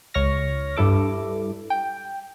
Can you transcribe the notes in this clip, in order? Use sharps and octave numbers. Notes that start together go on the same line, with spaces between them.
C#2 C#5 C#6 F6 A#6
G2 G3 E4 A4 D6
G5